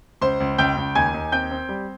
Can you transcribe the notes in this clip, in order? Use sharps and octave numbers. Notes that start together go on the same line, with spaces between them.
C#2 C5 C6
C#2
C#2 G5 G6
C#2
D#2 G#5 G#6
D#2
C4 G5 G6
C4
G3